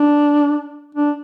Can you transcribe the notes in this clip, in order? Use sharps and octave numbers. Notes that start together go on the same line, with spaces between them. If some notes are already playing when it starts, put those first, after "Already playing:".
Already playing: D4
D4